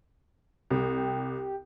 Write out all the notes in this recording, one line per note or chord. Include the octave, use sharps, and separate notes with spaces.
C2 G4